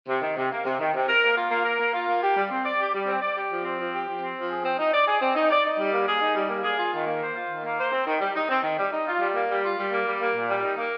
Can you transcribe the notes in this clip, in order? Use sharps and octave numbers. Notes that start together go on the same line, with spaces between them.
C3
D#3
C3
A#3
C3
D#3
C3
A#4
A#3
F4
A#3
A#4
A#3
F4
A#3
G4
G3
C4
D5
G4
G3
C4
D5
G4
F3
C4
F3
G4
F3
C4
F3
G#4
C4
D#4
D5
G#4
C4
D#4
D5
D#4
G3
A#3
G#4
D#4
G3
A#3
G#4
F4
D#3
A#3
C5
F4
D#3
A#3
C5
C4
D#3
G3
D#4
C4
D#3
G3
D#4
F4
G3
A#3
G3
F4
G3
A#3
G3
A#3
A#2
G3
D#4
A#3